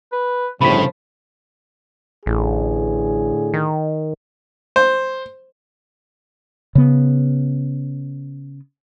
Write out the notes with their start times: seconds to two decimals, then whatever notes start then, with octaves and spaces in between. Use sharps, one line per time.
0.13 B4
0.61 G1 A2 C#3 F3 B5 B6
2.26 A1 A2 D3 G#4
3.54 D#3
4.76 C5
6.75 C#3 B3